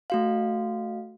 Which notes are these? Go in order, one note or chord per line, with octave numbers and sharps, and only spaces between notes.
A3 F#4 F5